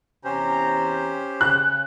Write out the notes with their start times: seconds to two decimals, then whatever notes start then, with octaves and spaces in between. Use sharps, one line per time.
0.24 E2 C3 C#4 G4 C5 A#5
1.41 C#3 F#6